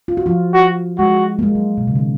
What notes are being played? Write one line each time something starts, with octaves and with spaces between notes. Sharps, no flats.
F4
F#4
F3 F4
F#4
G#3 F#4
A#3
G#3
F#3
B2
C#3
D#3